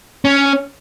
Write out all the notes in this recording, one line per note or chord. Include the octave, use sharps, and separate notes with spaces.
C#4